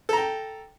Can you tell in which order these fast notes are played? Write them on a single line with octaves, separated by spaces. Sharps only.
A4 A#5 G5